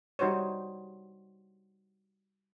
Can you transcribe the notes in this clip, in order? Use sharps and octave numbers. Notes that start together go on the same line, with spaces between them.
G3 D#4 F#4 C5 C#5